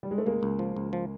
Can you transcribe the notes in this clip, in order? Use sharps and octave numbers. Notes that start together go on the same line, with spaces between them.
G3
G#3
A3
C#2 G#3 A#3
C#2
F3
C#2
F3